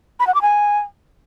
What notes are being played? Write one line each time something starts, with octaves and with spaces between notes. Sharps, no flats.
B5
F#5
D6
G#5